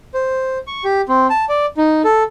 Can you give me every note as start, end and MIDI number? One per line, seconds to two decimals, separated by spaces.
0.14 0.58 72
0.67 0.84 85
0.84 1.01 67
1.09 1.27 60
1.30 1.45 81
1.49 1.66 74
1.77 2.02 63
2.04 2.23 69